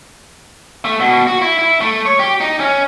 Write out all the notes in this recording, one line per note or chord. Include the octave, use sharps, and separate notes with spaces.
A3
B2
F#4
E4
E4
A3
C#5
G4
D#4
C#4